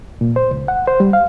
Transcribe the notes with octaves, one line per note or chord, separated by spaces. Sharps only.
A#2
C5
C#2
F#5
C5
G3
F5